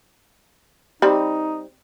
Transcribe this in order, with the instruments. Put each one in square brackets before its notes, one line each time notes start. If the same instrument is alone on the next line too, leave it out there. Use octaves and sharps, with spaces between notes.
[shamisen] G3 C4 B5 [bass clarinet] D#4